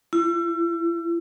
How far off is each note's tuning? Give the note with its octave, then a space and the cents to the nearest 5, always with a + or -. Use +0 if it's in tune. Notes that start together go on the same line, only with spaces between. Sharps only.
E4 +35